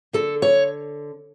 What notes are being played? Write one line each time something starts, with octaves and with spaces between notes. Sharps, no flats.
D3 A4
C#5